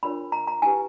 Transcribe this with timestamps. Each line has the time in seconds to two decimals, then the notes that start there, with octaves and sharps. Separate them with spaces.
0.03 D4 F4 A#4 C#5 B5
0.32 A#5
0.47 A#5
0.62 E4 G4 B4 G#5